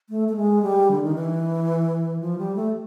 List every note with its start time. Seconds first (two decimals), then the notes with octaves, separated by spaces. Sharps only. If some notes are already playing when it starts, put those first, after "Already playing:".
0.10 A3
0.29 A3
0.36 G#3
0.62 G3
0.91 D3
1.03 D#3
1.15 E3
2.21 F3
2.38 G3
2.56 A3